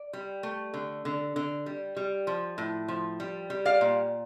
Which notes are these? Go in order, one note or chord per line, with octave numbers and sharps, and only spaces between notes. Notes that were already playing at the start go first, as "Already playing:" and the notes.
Already playing: D5
G3
A3
D3
D3
D3
G3
G3
F3
A2
F3
G3
G3
D5 F5
A#2